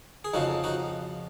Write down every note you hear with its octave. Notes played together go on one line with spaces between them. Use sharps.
G#4
F2 C#3 F3 D#4 F#4
D#4 F#4